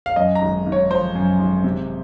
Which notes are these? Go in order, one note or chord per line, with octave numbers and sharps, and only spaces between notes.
F5
F#2 D#5
A#5
G#1
G#1
C#5
F3 C5
F#2
G#1
C3